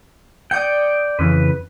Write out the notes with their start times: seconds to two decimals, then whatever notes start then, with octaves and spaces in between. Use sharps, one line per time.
0.51 D5 G5 D#6 G6 C#7
1.19 F2 C#3 E3 B4